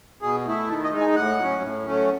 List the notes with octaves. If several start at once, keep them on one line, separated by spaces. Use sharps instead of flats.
B2 G#4
A3 E4
D#3 A4
D#5
G#3 D#4
G#5
A2 F#5
F#3 C#4
A2
F#3 A3 C#4